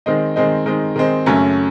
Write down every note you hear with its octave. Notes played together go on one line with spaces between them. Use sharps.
D#3 G#3 C4 D#4
D#3 G#3 C4 D#4
D#3 G#3 C4 D#4
D#3 G#3 C4 D#4
F#2 C#3 F#3 A3 C#4